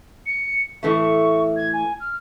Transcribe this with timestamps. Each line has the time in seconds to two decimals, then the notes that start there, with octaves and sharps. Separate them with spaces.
0.26 C#7
0.83 A2 E3 A3 C#6
1.56 G#6
1.73 G#5
2.00 F6